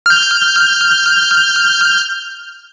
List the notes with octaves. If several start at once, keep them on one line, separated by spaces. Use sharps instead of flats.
F6 G6